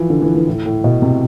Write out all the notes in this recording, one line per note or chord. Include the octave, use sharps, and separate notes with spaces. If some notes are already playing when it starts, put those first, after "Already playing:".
Already playing: E3 F3
D3
E3
E3
A2
A2
B2
C3